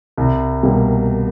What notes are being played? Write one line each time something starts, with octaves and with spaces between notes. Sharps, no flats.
C2
B2 G3 A#3